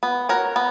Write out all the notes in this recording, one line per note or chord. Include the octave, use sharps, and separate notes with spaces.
B3
F#4 A#4 C#5
B3